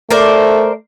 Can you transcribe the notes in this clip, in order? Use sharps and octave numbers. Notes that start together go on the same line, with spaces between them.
A3 A#4 C5 D5